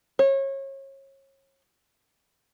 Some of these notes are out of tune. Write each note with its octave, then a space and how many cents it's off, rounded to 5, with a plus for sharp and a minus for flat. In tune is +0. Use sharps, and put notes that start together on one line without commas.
C#5 -30